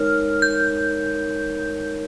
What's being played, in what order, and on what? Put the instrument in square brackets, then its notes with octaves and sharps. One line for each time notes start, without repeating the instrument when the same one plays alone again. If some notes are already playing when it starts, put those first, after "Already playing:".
Already playing: [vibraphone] G#3 D#4 A#4 C#5 [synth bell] F6
[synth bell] G6